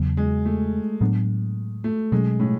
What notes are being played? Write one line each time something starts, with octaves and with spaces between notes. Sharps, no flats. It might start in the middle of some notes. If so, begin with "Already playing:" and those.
Already playing: E2 C#3 F#3 B3
G#3
A3
A2 F#3 B3 D4
A3
B2 F#3 G#3 C#4
A2